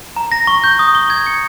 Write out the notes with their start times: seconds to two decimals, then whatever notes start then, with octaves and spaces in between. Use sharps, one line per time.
0.16 A#5
0.32 A#6
0.47 C#6
0.64 G6
0.79 D#6
0.95 G7
1.10 G#6
1.26 C#7